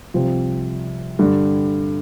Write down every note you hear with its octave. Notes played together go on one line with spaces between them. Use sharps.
C2 C3 F3 C4 F4
G2 D3 G3